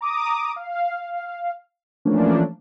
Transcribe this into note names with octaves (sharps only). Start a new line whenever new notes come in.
A#5 D6 D#6
F5
E3 F3 A3 A#3 C#4 D4